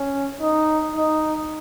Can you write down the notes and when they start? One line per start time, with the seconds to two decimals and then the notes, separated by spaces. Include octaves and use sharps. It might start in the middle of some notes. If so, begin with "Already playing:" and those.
Already playing: C#4
0.41 D#4
0.96 D#4